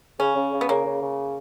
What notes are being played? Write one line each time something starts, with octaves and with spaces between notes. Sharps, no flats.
C#3 C#4
C#3
C#3
B3
C#3 A#3
C#3
C#3